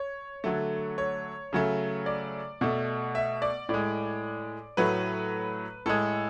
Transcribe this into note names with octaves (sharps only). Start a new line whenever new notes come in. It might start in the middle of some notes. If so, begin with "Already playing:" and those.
Already playing: C#5
D3 F#3 A3
C#5
C#3 F#3 A3
D5
B2 A3
E5
D5
A2 G#3 D5
A2 F#3 A3 B4
A2 G#3 A4